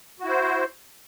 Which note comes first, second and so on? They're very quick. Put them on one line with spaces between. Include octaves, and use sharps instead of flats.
F#4 E4 C5